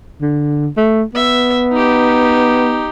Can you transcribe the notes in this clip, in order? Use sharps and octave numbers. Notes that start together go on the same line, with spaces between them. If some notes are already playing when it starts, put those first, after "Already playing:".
D3
A3
B3 E5
D#4 G4